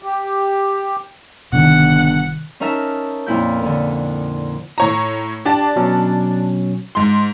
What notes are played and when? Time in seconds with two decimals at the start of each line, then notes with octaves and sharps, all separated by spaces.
0.03 G4
1.53 G1 C3 D#3 F#5
2.60 C#4 D#4 A#4 E5 A5
3.26 F2 A#2 E4 G6
3.63 A#2 D3
4.78 A2 C#5 A#5
5.45 D4 G4 D5 A5
5.76 B2 F#3 C#4
6.95 G#2 C6